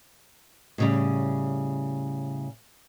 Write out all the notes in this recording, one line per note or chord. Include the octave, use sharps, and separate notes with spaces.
A2 C#3 G3